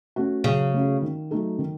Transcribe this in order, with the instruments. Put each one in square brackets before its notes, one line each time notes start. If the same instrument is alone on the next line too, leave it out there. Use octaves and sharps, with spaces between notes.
[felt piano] A3 C#4 F#4
[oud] C#3 [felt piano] F#3
[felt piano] A3 C#4 F#4
D#3
F#3 A3 D#4 A4
D#3